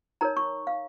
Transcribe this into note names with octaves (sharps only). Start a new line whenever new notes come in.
D#4 A#4 C#5 A#5
C#6
F5